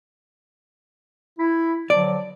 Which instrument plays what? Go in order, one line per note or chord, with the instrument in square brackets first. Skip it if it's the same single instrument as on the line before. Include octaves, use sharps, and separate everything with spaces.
[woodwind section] E4
[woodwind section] D3 F3 F#3 [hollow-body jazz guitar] D5